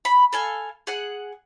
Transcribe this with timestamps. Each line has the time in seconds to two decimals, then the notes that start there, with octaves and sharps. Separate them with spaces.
0.05 B5
0.33 A4 F5 G#5
0.87 G#4 F#5